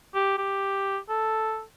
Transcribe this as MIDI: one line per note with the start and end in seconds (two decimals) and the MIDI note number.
0.15 0.37 67
0.38 0.98 67
1.09 1.63 69